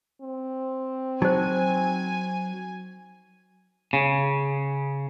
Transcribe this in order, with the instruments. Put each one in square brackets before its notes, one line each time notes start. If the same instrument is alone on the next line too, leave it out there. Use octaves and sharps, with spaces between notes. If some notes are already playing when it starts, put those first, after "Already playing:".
[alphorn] C4
[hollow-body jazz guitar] F#3 [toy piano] D#4 C5 [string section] G#5
[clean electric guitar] C#3